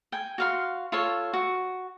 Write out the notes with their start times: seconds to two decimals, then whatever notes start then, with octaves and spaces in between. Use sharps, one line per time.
0.12 G5 G#5
0.38 F#4 F5 C6
0.92 F4 A4 C#5
1.33 F#4